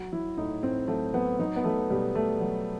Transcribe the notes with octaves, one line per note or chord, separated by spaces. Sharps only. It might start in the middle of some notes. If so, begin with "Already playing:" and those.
Already playing: F#3 F#4
F#3 E4
A2 D#4
A2 C4
F#3 A3
F#3 B3
F#3 D#4
B3
F#3 A3
B2 G3
B2 A3
F#3